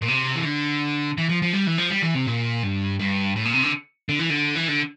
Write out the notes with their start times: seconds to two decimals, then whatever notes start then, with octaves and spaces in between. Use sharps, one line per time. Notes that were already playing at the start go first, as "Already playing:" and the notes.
0.02 A#2
0.08 C3
0.35 E3
0.45 D3
1.18 E3
1.29 F3
1.42 F3
1.53 G3
1.67 E3
1.78 F3
1.90 G3
2.02 E3
2.15 C3
2.27 A#2
2.63 G2
2.99 G2
3.36 A2
3.45 A#2
3.54 C3
3.63 D3
4.09 D3
4.19 E3
4.30 D3
4.56 E3
4.69 D3